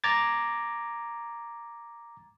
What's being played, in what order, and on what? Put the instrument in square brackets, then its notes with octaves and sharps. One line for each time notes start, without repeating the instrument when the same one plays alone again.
[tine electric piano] A#5 D6 G#6 A6